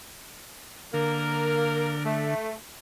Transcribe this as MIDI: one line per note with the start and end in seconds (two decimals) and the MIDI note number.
0.94 2.34 50
0.94 2.00 58
0.94 2.00 70
2.05 2.52 57